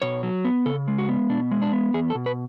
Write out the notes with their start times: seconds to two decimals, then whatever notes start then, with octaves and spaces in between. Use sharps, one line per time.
0.02 B2 C#5
0.23 F#3
0.45 B3
0.66 C#3 A4
0.88 G#3
0.98 F#4
1.09 B3
1.29 B2 D4
1.51 G#3
1.62 D4
1.73 B3
1.94 E2 G#4
2.10 A4
2.15 B2
2.26 B4